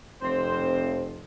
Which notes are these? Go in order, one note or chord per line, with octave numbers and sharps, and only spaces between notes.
F1 C4 C5